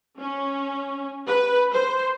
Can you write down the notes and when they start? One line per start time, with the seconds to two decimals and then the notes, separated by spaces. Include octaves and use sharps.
0.19 C#4
1.27 B4
1.72 C5